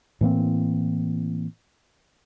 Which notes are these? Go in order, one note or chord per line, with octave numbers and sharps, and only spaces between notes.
A2 E3 A#3 C4